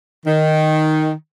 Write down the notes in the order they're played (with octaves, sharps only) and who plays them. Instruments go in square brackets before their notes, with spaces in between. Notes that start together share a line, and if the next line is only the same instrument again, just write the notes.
[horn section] D#3